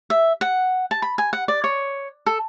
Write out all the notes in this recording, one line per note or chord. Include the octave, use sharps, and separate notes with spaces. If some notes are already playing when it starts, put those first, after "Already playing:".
E5
F#5
A5
B5
G#5
F#5
D5
C#5
A4